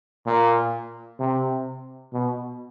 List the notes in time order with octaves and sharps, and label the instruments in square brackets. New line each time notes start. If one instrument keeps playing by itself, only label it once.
[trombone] A#2
C3
B2